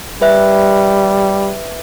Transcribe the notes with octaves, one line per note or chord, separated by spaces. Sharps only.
G3 B4 E5 F#6